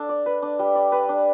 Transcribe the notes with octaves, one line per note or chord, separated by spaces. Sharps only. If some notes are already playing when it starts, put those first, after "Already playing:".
Already playing: D4 A4
D5
B4
D4
G3
D5
B4
D4